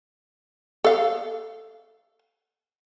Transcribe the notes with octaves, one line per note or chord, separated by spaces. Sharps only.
A4 F5